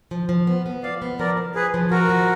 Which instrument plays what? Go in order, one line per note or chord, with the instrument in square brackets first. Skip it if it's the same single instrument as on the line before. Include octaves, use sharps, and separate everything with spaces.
[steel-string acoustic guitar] F3
F3
B3
B3
[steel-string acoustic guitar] F3 [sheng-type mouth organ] D5 F5
[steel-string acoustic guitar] B3
[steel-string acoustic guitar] F3 [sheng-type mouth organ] A#4 D5
[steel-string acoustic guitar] F3
[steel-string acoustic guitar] F4 [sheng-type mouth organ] G#4 B4
[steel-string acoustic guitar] F3
[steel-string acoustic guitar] F4 [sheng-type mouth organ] F#4 A#4
[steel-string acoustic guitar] F3